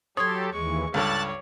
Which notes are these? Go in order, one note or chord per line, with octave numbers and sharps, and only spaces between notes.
F#3 G4 A4 C#5 C6 D#6 G#6
D#2 E3 G#3 C#6
C#2 G2 A4 C#5 D5 A5 F#6 A6